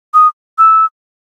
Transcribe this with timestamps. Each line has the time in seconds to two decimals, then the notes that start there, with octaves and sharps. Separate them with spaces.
0.14 D#6
0.58 E6